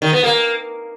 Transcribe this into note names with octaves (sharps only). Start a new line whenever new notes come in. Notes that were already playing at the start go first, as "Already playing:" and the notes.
D#3
B3
A#3